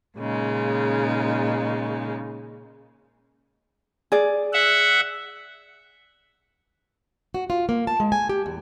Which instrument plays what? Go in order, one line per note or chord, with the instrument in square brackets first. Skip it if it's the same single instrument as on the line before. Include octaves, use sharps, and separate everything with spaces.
[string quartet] A#2 C#3 G#3 D#4
[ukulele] G#4 D5
[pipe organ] E5 F#5
[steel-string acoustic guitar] F#4
F4
A#3
A5
G#3
G#5
G4
E2